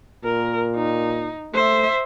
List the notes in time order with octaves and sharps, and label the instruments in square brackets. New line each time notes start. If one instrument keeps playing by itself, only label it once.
[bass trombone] A#2 [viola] A#4
[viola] D#4
[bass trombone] A3 [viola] C5 E5